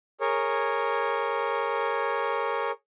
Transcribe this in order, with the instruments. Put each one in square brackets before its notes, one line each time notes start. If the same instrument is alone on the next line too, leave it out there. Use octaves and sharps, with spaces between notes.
[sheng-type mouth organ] G#4 A#4 C#5